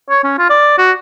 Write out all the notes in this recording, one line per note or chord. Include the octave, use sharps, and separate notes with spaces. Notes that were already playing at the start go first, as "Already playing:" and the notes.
C#5
C#4
F4
D5
F#4